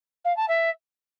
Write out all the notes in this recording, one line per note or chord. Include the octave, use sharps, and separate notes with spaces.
F5
A5
E5